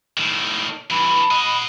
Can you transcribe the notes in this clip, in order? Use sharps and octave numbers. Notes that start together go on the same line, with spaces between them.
A2 D#3
G2 E3 B5
D#5 F#5